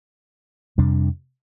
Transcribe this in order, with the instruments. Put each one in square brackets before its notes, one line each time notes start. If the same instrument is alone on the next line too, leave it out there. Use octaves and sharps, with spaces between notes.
[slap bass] F2 C3 G3 D4